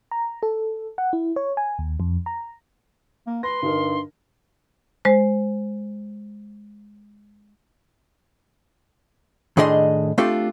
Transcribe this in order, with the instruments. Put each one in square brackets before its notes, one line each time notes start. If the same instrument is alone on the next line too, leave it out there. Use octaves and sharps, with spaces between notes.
[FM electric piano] A#5
A4
F#5
E4
C#5
G#5
D#2
F2
A#5
[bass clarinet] A#3
[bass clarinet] B4 [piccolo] C6 [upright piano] A#6
[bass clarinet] G2 [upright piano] D3 D#4 A#4
[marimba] G#3 C5
[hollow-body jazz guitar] A2 D#3 D4 G#4 D#5 C6
A3 C4 D4 F4 G4 A4